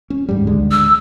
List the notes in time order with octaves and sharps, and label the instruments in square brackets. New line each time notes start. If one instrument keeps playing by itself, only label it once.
[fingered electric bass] C#4
D#2 G#2 G3
D2 D3 G#3
[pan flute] E6